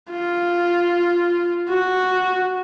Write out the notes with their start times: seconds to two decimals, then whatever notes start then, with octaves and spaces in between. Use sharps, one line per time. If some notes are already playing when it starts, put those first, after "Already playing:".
0.11 F4
1.69 F#4